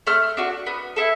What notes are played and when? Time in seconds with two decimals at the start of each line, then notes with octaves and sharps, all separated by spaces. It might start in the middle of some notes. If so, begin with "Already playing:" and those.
0.07 A3 F6
0.37 D4 F#4
0.66 B3
0.96 E4 A4